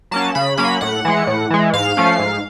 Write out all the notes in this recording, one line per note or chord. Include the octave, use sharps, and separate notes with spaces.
F#3 A#3 C#4 A5
C#3 B5
F#3 A#3 C#4 B5
A2 F#5
E3 G#3
A2
E3 G#3
G#2 F5
F3 A3 C#4
G#2